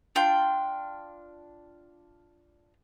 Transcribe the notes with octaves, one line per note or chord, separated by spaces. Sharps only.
D4 F4 G5